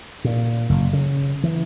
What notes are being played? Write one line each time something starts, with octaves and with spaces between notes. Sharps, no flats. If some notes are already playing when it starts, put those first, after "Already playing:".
A#2
F#1
C#3
E3